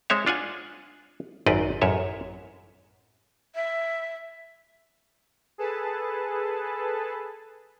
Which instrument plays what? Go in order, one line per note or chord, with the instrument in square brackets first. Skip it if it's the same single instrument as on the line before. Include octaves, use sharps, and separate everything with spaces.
[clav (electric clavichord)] G#3 C4 C5 C#5 E5
D4 F4 F#5 G#5
G#1 F#2 C4 B4 D5 D#5
A1 F#2 C#5 E5
[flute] E5
[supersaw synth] G#4 A4 B4 A5